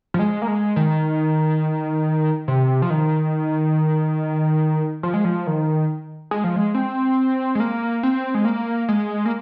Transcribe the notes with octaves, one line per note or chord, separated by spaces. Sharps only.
F3
G#3
A#3
G#3
D#3
C3
F3
D#3
F3
G#3
F3
D#3
G#3
F3
G#3
C4
G#3
A#3
C4
G#3
A#3
G#3
A#3